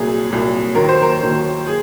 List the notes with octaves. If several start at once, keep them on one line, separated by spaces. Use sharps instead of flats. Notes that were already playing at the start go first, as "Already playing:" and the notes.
Already playing: C2 A#2 F#3 G#4
C2 A#2 F#3
D#2 D#3 F#3 A#4
C5
A#4
D#2 D#3 F#3
G#4